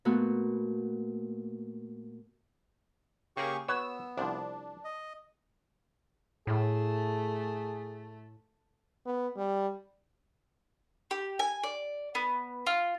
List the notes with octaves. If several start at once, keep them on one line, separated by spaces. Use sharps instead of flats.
A#2 A3 B3 F#4
C#3 A#3 G4 G#4 C#6
B3 F#4 B4 C#5 E6
C2 F3 D4
D#5
A2 A3 G#4
B3
G3
G4
G#5
D5
B3
F4